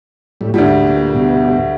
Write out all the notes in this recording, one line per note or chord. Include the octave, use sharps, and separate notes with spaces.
A2 G3
D2 G#2 G3
A#2
G2 B2